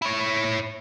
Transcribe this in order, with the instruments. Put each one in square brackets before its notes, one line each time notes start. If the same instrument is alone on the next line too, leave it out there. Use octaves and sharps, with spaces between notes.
[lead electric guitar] E4 C#5